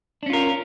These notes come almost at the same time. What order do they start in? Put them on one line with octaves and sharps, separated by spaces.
D4 C#4 F4 A#4